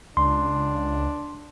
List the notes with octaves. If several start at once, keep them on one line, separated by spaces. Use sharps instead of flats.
C#2 D4 C6